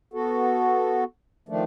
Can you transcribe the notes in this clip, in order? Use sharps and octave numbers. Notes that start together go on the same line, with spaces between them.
B3 F#4 A4
D#3 F3 A3 D4